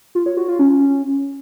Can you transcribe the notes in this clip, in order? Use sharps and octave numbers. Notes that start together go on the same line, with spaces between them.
F4
C#5
F#4
F4
C#4